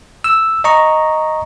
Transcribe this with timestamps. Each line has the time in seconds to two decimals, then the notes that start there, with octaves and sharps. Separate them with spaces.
0.24 E6
0.64 D#5 A#5 C#6